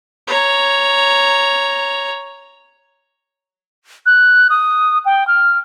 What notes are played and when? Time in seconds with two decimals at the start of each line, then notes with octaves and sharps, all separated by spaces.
0.27 C#5 A#5
4.06 F#6
4.50 D#6
5.05 G5
5.27 F6